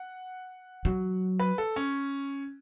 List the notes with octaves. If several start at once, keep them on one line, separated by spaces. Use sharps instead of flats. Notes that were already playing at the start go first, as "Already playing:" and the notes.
Already playing: F#5
F#3
B4
A4
C#4